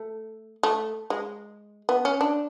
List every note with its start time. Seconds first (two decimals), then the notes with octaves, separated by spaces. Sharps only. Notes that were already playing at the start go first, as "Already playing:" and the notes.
Already playing: A3
0.63 A3
1.10 G#3
1.89 B3
2.05 C#4
2.21 D4